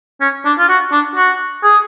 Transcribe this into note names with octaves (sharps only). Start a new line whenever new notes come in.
C#4
D4
F4
F#4
D4
F#4
G#4